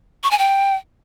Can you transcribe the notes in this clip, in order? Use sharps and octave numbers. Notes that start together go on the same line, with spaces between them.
C#6
G#5
G5